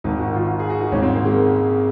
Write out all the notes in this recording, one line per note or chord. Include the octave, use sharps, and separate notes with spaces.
G#1 G#2 D#3 D#4
F#4
F4
G#4
F#4
D#4
G#1 G#2 D#3 C#4
C4
A#3
G#3